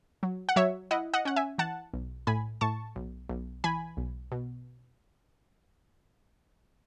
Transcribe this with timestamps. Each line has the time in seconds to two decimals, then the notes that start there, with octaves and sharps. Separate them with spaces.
0.23 F#3
0.49 F#5
0.56 F#3 C#5 E5
0.91 E4 D#5 F#5
1.14 D#5 F#5
1.25 C#4 F#5
1.36 E5 G#5
1.58 E3 F#5 A5
1.94 B1
2.27 A2 G#5 B5
2.61 A2 A5 C#6
2.96 B1
3.29 B1
3.64 E3 G#5 B5
3.97 B1
4.32 B2